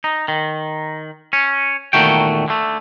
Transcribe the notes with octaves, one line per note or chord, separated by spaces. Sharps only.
D#4
D#3
C#4
E2 A#2 D#3 A3 F#4 G5
D3 A3